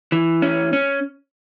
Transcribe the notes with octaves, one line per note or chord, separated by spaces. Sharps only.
E3
C#4
C#4